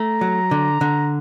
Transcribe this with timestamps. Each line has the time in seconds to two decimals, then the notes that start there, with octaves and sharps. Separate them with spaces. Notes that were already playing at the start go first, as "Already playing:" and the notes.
Already playing: A3 A#5
0.21 F#3
0.51 D3
0.81 D3